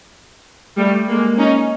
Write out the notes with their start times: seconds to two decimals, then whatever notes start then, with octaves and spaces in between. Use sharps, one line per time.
0.77 G3 A3
1.08 G#3 A#3
1.38 C#4 D#4